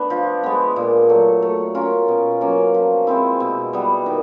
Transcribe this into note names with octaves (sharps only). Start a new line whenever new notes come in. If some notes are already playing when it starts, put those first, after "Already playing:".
Already playing: A3 B3 D4 B4
F3
G#3 B3
A#2
F#3 A3
A3
C#4 F4 A#4
B2
F#3 A#3 C#4
F3
G#3 C4 E4
B2
G3 B3
D#3